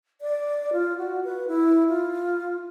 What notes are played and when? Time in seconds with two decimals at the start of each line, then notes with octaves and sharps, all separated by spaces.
0.21 D5
0.73 F4
0.98 F#4
1.24 B4
1.48 E4
1.89 F4